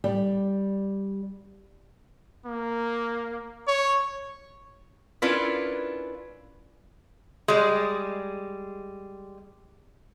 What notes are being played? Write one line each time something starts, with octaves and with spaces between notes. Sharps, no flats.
G3
A#3
C#5
C#4 D4 E4 F4 A#4 B4
G3 G#3